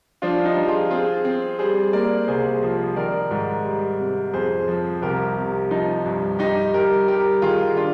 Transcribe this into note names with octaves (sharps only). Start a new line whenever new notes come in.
F3 D4 F4
D#4 G4
F3
F4 G#4
C4 F4 G#4
C4
G3 G#4 C5
A#3 A#4 D5
C2 G#4 C5
F3
D#3 A#4 D5
G#2
G3
C3
F2 G#4 C5
F3
C2 G4 A#4
C3
F3 D#4
G2
G2 D#4 G4
G2 G4 A#4
G3 G4 A#4
D#3 F4 G#4
D4 F4